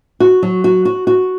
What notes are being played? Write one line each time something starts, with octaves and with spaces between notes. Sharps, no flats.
F#4
F#3
F#4
F#4
F#4